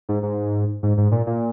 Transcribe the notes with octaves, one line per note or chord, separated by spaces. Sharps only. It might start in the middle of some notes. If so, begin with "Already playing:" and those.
G#2
G#2
G#2
G#2
A#2
A#2